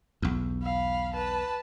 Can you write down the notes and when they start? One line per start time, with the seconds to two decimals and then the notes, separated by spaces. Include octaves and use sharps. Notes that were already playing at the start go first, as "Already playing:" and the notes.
0.22 B1 E2
0.63 F5 B5
1.14 B4 A5